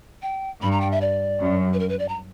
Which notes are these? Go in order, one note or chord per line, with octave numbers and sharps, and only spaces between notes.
G5
G2 B5
A#5
G5
E5
D5
F#2
B4
A#4
B4
D5
A#5